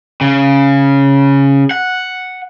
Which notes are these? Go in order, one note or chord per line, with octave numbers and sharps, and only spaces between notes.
C#3
F#5